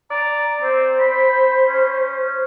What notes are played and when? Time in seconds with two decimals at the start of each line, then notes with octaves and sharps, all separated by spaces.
0.10 D5 A#5
0.62 C4 C5
1.00 B5
1.68 C#4